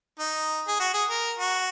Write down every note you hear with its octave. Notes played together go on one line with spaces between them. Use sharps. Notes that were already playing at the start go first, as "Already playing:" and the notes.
D#4
G#4
F#4
G#4
A#4
F#4